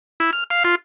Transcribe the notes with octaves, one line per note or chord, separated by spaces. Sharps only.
E4
F6
F5
F4